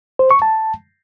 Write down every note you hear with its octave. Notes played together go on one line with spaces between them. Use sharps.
C5
C#6
A5